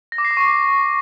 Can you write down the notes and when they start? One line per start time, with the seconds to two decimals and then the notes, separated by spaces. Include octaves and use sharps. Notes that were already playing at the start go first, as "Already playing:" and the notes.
0.12 A#6
0.18 D6
0.25 C7
0.31 D6
0.37 C#6